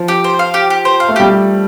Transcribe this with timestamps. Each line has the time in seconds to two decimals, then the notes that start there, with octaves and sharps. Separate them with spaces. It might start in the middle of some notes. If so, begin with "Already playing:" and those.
Already playing: F3
0.08 G4
0.24 C5
0.39 F5
0.54 G4
0.70 G4
0.85 C5
1.00 F5
1.08 A3
1.16 G3 G4